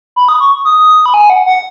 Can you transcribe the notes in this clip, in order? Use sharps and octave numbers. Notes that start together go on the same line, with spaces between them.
B5
D#6
C#6
D#6
B5
G#5
F#5
F#5